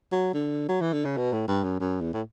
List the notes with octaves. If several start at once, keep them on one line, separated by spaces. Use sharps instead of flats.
F#3
D3
F#3
E3
D3
C#3
B2
A2
G2
F#2
F#2
E2
A2